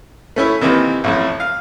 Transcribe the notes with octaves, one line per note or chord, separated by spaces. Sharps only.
A3 C#4 E4
C3 D#3 E3 A#3
A1 F2 A2
F5